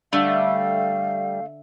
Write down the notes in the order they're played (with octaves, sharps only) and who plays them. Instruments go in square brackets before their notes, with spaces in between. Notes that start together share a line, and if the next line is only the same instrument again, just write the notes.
[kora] D3 [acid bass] G3 [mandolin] A3 [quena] F5